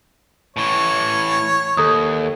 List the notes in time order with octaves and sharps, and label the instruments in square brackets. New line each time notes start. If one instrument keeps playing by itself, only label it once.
[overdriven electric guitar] A2 E3 [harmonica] C#5
[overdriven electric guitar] D#2 [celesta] A4 A#5 D#6